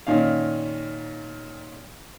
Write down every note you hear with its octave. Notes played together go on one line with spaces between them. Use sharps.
A#2 D#3 C#4 F5